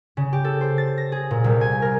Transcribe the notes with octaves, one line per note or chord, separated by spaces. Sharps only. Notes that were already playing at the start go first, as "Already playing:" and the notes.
C#3
G4
A4
C5
A6
A#6
G#4
A#2
C2
G#5
A#4